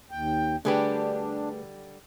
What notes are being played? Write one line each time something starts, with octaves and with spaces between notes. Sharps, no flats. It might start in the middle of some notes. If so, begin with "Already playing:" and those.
D#2 G5
D3 G3 A3 D4 G4 G#4 B4